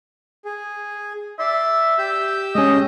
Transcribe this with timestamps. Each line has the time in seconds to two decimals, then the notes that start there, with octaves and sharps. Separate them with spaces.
0.45 G#4
1.39 D5 E5 C6
1.98 G4 E6 G6
2.55 G#3 C#4 D#5